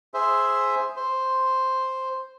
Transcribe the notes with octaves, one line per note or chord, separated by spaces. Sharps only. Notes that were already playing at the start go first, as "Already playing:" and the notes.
G#4 C5 E5
C5